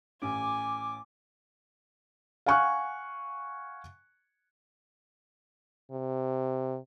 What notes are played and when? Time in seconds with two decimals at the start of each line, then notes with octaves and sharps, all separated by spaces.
0.22 A1 G#5 D6
2.46 F5 F#5 G#5 C#6 F6 F#6
5.91 C3